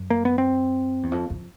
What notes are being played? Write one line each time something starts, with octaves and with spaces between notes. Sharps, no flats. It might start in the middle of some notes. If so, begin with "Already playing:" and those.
Already playing: F#2
A#3
B3
C4
E2
F2
F2